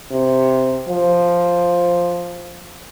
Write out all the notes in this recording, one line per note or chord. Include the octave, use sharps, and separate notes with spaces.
C3
F3